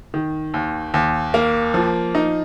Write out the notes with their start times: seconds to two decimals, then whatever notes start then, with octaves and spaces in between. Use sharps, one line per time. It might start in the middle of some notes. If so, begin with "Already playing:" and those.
0.14 D#3
0.54 D#2
0.94 D#2
1.34 A#3
1.74 F3
2.15 D#4